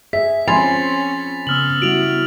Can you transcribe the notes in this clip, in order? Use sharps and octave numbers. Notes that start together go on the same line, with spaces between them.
G#4 E5 B6
F3 C4 C#4 G#5 B5 C6 A6 F7
C#3 B3 E6 F6 F#7
G3 E4 F#4 D7 F7